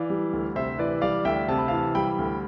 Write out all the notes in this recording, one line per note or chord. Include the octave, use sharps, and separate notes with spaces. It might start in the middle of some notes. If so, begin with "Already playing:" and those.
Already playing: E3 D5 F5
G3
D2
C3 C5 E5
E3 B4 D5
G3 D5 F5
D2 E5 G5
C3 A5
B5
E3 F5 A5
G3 G5 B5
D2